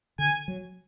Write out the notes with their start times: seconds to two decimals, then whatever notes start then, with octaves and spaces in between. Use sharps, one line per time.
0.19 D3 G#5
0.48 F#3